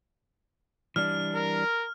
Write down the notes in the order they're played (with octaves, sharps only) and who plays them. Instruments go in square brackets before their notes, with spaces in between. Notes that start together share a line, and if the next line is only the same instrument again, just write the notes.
[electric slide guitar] E3 G3 D4 [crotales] F6
[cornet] A#4